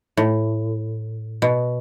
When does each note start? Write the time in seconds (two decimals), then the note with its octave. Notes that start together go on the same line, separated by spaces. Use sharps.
0.17 A2
1.42 B2